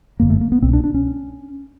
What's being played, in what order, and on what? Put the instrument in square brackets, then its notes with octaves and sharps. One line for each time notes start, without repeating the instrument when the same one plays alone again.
[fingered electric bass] G1 F#2 D3 A#3
A3
A#3
B3
C2 B2 C4
D4
D4
C#4